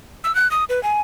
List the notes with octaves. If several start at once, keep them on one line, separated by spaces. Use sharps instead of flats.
E6
F#6
D#6
B4
G#5